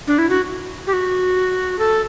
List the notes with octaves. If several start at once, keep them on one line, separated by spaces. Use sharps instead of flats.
D4
E4
F#4
G4
F#4
A4